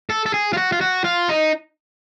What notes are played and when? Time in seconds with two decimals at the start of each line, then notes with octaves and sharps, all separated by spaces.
0.10 A4
0.26 A4
0.34 G#4
0.53 F4
0.57 F#4
0.72 F4
0.81 F#4
1.04 F4
1.29 D#4